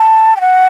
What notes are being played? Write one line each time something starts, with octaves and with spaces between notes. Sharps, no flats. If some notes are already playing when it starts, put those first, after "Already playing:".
Already playing: A5
G5
F#5